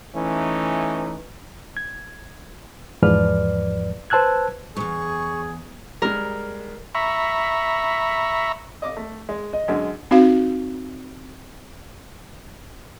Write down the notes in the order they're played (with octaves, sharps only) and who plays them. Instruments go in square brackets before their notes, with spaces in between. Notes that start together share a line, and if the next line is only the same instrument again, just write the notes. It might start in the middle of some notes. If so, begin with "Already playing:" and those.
[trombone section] E3 A3 C#4 D#4
[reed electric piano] G#6
E2 G#2 F3 B4 D5 F6
B4 C5 A5 E6 F#6 G#6
[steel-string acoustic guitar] E2 G#2 [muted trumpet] G#4 [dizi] C#6
[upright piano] G3 G#3 [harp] A#4
[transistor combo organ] E5 A#5 B5 C#6
[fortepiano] D#5 D6
A3
G#3
[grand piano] D#5
[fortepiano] F#2 D3 G#3
[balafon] C4 D#4 F#4 F5